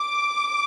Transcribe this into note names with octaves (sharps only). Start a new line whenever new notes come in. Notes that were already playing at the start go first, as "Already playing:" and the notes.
Already playing: D6